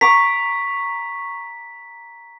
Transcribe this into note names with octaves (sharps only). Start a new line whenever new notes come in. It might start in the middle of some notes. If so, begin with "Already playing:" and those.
A#5 C#6 D6 B6